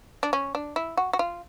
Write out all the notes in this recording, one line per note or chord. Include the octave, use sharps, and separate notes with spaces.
D4
C#4
D4
E4
F#4
F#4
F4